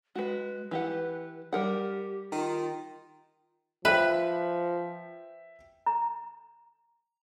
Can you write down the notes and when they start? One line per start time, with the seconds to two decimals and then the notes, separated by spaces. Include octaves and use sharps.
0.15 G#3 F#4 B4
0.71 E3 G4 B4 F#5
1.53 G3 G4 A#4 F#5
2.32 D#3 F4
3.85 F3 B4 E5 G5 B6
5.86 A#5